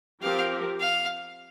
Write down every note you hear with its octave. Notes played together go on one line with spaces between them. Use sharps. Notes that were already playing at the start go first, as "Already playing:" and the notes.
F3 C4 G4 A#4 F5
F5